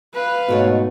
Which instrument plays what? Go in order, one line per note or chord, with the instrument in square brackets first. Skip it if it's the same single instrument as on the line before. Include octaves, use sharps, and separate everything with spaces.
[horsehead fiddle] B4 F5
[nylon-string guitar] G#2 A3 C#5 [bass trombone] B2